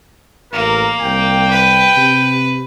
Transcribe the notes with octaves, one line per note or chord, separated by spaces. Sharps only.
A1 A#3 A#4
C2 G5
B4
C3